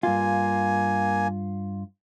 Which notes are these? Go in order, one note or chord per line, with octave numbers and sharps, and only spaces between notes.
G2 A#3 F4 G#5